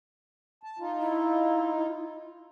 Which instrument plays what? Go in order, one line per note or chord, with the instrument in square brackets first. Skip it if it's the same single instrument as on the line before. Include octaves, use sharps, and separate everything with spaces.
[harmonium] A5
D#4 F4
[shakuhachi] E4